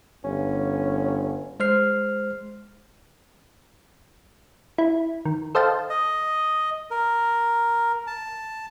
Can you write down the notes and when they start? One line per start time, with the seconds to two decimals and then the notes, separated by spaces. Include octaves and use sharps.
0.24 G1 C#4
1.60 G#3 C5 F6 C7
4.78 E4
5.25 D#3
5.55 A4 C5 D#5 F5 G5 A5
5.90 D#5
6.91 A#4
8.07 A5